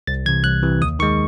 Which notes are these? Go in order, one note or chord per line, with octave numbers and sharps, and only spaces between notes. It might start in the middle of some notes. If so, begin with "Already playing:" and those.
C2 A6
C3 E3 G#6
C2 F#6
C3 E3
D#2 D#6
D#3 G#3 C#6